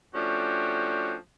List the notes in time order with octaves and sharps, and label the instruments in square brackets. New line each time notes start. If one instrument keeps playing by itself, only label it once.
[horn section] F3 A3 C#4 D4 F#4 G4